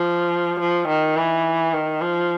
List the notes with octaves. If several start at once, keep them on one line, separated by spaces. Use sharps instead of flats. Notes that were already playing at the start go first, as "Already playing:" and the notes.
Already playing: F3
F3
D#3
E3
D#3
F3